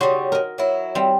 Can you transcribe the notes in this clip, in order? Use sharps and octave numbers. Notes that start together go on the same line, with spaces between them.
C#3 G3 F#4 C6
A#4 D#5
F#3 E4
G3 C4